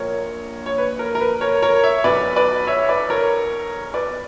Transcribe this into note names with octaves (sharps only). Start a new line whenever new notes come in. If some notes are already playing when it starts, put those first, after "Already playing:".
Already playing: A#1 A#2 A#4 C#5
C#5
B4
A#4
A#4
B4
A#4 C#5
A#4 C#5
C#5 E5
B1 B2 B4 D5
B4 D5
C#5 E5
B4 D5
A#4 C#5
B4 D5